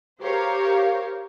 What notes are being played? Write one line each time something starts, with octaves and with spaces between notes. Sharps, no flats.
G4 A#4 C5 C#5 F5